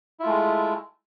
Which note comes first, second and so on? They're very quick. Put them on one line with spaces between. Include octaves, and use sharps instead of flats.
E4 F4 A3 G#3